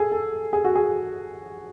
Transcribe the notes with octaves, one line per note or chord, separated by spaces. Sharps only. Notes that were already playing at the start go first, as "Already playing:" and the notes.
Already playing: G#4 A4
A4
G#4
F#4
G#4